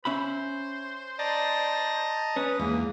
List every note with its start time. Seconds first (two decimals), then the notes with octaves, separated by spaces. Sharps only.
0.05 C#4 C5 E5 B5
1.19 D5 D#5 A5 A#5
2.36 C#4 B4 D#6
2.59 E2 G#2 A#3